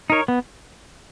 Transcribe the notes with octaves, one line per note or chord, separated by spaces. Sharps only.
D#4 A#4 C#5
B3